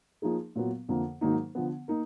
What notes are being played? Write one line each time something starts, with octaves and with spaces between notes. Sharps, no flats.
F3 A#3 D#4 G#4
A#2 F#3 B3
F2 D3 F3 A#3
G#2 D#3 F#3 A#3 D#4
D3 F3 B3
A#3 D#4 A#4